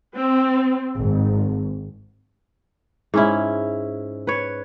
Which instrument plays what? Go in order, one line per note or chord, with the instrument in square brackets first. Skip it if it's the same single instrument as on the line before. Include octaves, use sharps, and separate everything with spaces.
[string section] C4
G#1
[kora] G#2 C#4 E4
B4 C#5